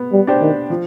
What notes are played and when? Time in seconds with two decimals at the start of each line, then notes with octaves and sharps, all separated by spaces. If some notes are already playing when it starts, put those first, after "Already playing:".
Already playing: B3
0.12 G3
0.27 D4 G4 C5
0.41 D#3
0.70 F3